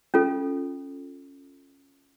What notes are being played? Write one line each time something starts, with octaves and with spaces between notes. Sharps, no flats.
C#4 F4 A4